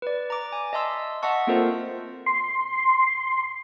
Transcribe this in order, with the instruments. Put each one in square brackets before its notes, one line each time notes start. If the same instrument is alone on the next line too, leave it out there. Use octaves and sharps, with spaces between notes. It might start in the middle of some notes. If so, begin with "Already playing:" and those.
[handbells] B4 D5
A#5 D6
G#5
D#5 E5 A5 C6 E6
D#5 E5 F#5 A5 C#6 E6
A#3 C4 F4 A4 A#4 C5
[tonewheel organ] C6